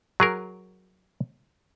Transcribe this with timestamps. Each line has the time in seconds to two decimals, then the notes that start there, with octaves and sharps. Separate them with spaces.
0.20 F#3 G#4 A#4